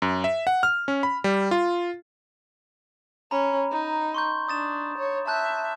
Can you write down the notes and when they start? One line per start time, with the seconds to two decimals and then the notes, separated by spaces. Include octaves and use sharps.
0.02 F#2
0.24 E5
0.47 F#5
0.63 F6
0.88 C#4
1.03 B5
1.24 G3
1.51 F4
3.31 C#4 A#5 B5
3.71 D#4
4.14 C6 C#6 G6
4.48 D4 D#6 A6 E7
4.98 C#5
5.27 E5 A5 F#6 G6